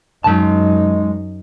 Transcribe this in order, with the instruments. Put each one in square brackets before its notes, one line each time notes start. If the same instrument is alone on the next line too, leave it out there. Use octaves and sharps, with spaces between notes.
[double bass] F#2 D#4 [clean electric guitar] G#3 A5